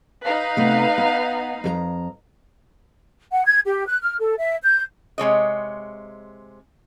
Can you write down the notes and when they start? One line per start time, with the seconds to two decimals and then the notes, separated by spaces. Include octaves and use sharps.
0.24 D#4 B4 F5
0.57 C3 A3 B3
0.98 B3
1.64 F2 A4 A#5
3.32 F#5
3.46 G#6
3.65 G4
3.86 F#6
4.02 F6
4.20 A4
4.38 E5
4.63 G6
5.18 C3 G#3 C#5 D#5